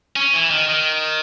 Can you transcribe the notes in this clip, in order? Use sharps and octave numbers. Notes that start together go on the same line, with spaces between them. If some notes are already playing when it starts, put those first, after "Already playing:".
C#4
E3
D#3
D#3